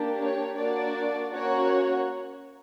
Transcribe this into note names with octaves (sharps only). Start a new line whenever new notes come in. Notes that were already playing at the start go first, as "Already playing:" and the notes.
Already playing: A#3 D4 G4
C#5
A#3 D4 F#4 D5
A#3 C#4 F#4 C#5